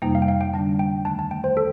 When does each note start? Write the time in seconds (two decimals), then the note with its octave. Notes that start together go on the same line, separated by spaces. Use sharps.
0.02 F2 C3 G3 A#3 D#4 G5
0.15 F5
0.22 G5
0.28 F5
0.41 G5
0.54 D3 G3 D4 A5
0.79 G5
1.05 D#2 D#3 A3 A5
1.19 A5
1.31 G5
1.44 C5
1.57 A4